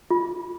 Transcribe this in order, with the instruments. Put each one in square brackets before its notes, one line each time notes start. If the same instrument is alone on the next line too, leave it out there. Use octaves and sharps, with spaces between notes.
[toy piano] F4